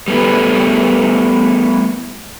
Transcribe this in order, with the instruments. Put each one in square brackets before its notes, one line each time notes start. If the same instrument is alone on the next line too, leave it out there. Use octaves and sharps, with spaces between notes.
[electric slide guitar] G3 A3 B3 E4